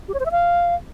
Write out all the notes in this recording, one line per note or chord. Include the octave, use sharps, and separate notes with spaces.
G4
C#5
C5
E5
F5